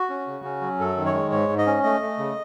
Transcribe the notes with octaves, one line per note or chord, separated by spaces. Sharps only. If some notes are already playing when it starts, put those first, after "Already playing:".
Already playing: F#4
C#4
C#3
C#4
F#3
F#2 A4
D#3
C#5
G#3
G#2 C#5
G#2
D#5
C#4
A3 D#5
A3
C#3